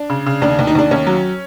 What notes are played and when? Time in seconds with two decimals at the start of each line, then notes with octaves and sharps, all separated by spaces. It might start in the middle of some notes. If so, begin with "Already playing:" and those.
Already playing: D4
0.10 C#3
0.26 C#3
0.42 D#2 D4
0.59 D#2
0.67 D#4
0.75 D#2 D4
0.91 D#2 C#4
1.07 F#3